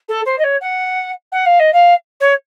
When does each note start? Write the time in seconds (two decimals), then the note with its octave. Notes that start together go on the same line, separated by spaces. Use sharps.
0.08 A4
0.25 C5
0.38 D#5
0.43 C#5
0.61 F#5
1.32 F#5
1.45 F5
1.59 D#5
1.73 F5
2.20 C#5